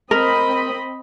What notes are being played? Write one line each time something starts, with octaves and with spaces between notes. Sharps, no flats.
C4 A#4 D#5 B5